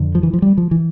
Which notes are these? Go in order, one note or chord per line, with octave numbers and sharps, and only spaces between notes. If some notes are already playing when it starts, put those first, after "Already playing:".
Already playing: F2 D3
F3
E3
F3
G3
F3
E3